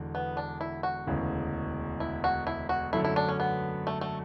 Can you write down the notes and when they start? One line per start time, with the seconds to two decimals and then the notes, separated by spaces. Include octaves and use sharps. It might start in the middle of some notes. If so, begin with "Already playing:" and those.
Already playing: E1 E2 D3
0.15 B3
0.37 D4
0.61 E4
0.83 F#4
1.07 E1 D2 C#3 E3
2.00 E4
2.24 F#4
2.47 E4
2.69 F#4
2.93 F#2 D3 F#3 A3 E4
3.05 E4
3.16 D4
3.29 C#4
3.40 B3
3.87 A3
4.01 A3